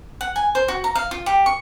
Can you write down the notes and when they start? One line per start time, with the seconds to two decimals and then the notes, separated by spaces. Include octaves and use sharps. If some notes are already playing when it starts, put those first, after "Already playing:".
0.21 F#5
0.36 G#5
0.55 C5
0.68 F#4
0.84 A#5
0.95 F5
1.11 F4
1.26 G4
1.46 C#6